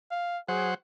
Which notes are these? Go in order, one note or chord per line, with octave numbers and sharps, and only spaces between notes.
F5
F#3 G#4 C5 F#5